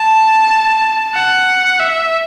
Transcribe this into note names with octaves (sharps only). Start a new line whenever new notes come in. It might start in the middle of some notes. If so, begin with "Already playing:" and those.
Already playing: A5
F#5
E5